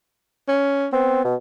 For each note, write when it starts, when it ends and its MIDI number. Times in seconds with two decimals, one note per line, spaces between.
0.48 0.87 61
0.93 1.23 59
0.93 1.25 60
1.25 1.35 47